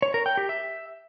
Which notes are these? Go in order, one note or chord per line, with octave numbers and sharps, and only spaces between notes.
C#5
A#4
G5
G4
E5